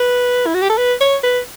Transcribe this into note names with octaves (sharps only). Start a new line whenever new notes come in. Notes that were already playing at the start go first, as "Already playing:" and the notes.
Already playing: B4
E4
F#4
G4
A4
B4
C#5
B4